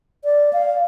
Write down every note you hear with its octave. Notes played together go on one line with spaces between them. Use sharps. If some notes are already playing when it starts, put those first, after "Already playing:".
D5
F5